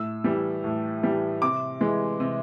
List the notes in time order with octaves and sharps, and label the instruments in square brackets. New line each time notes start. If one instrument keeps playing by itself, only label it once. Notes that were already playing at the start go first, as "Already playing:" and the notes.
Already playing: [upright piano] A2 E6
E3 G3
A2
E3 G3
C3 D6
E3 G#3
C3